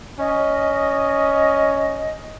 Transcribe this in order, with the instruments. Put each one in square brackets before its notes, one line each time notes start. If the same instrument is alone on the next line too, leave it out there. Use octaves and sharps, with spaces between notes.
[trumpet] C#4 [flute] D#5